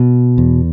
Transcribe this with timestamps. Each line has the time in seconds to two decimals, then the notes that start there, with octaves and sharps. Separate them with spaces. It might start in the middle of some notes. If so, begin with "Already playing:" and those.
Already playing: B2
0.38 E2